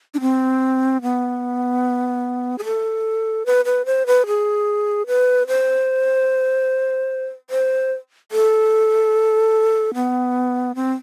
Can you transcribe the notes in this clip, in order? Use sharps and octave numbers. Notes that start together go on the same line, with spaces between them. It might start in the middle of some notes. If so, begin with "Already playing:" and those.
D4
C4
B3
G#4
A4
B4
B4
C5
B4
G#4
B4
C5
C5
A4
B3
C4